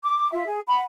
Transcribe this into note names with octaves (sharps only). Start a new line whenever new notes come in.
D6
F4 E5
G#4
F#5 B5